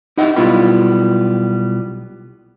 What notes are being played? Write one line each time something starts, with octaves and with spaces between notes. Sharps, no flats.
D#4 E4 G4 D#5 F#5
B1 G3 B3 E4 F4 B5